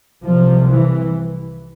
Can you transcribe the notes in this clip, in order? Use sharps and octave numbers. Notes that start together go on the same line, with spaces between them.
C2 C3 F3
E3